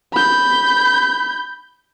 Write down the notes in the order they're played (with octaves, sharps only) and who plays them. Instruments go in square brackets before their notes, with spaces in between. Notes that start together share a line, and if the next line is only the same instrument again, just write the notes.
[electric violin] B5 G6